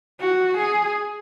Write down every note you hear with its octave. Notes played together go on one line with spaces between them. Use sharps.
F#4
G#4